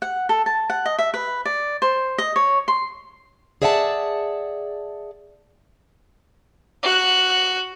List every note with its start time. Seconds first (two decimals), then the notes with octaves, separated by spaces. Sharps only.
0.02 F#5
0.29 A4
0.46 A5
0.70 F#5
0.86 D#5
0.99 E5
1.14 B4
1.45 D5
1.82 C5
2.18 D#5
2.36 C#5
2.68 C6
3.62 G#4 D5 E5 F#5 G#5 A5
6.83 F#4 F#6